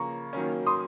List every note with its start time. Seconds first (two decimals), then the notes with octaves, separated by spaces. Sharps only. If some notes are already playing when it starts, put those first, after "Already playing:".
Already playing: C#3 F3 A#3 A#5 C#6
0.33 D#3 F#3 A#3 C#4
0.66 C6 D#6